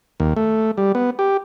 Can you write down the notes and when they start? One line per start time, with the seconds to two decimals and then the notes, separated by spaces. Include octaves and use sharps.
0.20 D#2
0.36 A3
0.77 G3
0.95 B3
1.19 G4